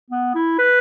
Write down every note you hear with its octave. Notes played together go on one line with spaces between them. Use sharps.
B3
E4
B4